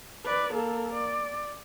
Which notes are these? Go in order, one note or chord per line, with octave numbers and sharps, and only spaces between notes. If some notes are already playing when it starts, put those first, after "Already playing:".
B4 D5
A#3 A4
D5